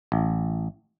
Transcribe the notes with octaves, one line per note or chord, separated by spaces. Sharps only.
A1